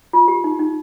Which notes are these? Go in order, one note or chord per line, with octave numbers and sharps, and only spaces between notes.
F4
G4
D#4
D#4